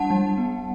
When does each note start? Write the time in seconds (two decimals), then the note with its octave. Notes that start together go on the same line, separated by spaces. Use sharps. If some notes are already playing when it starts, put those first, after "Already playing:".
Already playing: G3 D4 F#5 A5
0.10 G3
0.38 B3